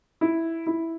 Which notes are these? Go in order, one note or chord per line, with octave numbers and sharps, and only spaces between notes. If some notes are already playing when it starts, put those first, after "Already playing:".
E4
E4